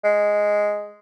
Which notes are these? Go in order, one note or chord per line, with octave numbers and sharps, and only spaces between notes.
G#3